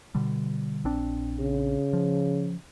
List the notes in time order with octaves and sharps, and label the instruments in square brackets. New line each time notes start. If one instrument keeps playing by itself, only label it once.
[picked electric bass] B2 D3 G3
A#1 C4 D4
[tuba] C#3
[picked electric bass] F3